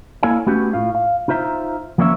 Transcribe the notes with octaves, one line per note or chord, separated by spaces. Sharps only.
A#3 E4 A4 C#5 F5 G#5
A3 B3 C#4 F#4 G4
A2 F4 F5
F5
D#4 F4 C5 E5 A#5
F3 A#3 C4 C#4 C#5 E5